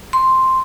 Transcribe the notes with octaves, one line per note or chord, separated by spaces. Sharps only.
C6